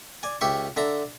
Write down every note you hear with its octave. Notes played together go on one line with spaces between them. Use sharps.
D5 G#5
C#2 G4 E5 C#6
D3 E5 A5 A#5